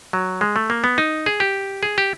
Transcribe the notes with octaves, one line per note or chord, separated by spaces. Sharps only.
F#3
G#3
A3
A#3
B3
D#4
G#4
G4
G#4
G4